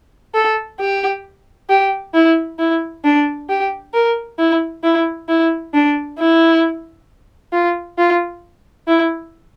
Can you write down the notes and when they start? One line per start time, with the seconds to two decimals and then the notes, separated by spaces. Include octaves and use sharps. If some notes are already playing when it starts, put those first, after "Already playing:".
0.34 A4
0.79 G4
1.70 G4
2.14 E4
2.59 E4
3.04 D4
3.49 G4
3.94 A#4
4.39 E4
4.83 E4
5.29 E4
5.74 D4
6.18 E4
7.53 F4
7.98 F4
8.87 E4